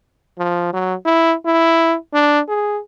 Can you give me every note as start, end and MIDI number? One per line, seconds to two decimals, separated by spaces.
0.38 0.70 53
0.73 0.94 54
1.05 1.34 64
1.46 1.96 64
2.14 2.40 62
2.48 2.80 68